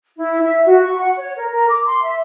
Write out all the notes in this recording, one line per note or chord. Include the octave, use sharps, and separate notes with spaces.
E4
E5
F#4
C#6
F#5
C#5
A#4
A#4
D6
C6
E5